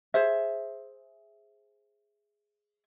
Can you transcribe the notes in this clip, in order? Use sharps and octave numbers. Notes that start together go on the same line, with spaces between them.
G#4 C5 E5